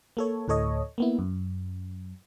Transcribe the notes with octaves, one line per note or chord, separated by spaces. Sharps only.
A#3 A4 C#5
D2 A2 A4 C#5 D#5
A#3 B3 E4
F#2